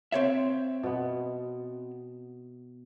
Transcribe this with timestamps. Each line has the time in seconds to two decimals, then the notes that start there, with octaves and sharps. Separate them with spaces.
0.12 C4 C#5 E5
0.83 B2 B3